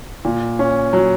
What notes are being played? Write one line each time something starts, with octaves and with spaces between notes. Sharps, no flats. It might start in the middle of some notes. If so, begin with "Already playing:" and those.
A#2
C#4
F#3